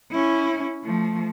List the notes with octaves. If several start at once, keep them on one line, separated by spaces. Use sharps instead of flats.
C#4 E4
F3 A3